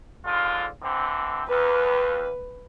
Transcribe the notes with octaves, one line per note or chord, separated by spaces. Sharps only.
G#2 D3 F4
D3 E3 C4
D#2 B4